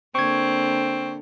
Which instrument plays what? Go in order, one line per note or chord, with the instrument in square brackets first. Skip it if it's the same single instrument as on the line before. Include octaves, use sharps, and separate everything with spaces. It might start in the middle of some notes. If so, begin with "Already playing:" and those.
[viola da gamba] D3 A#3 [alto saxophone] C4 [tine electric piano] C#6 G#6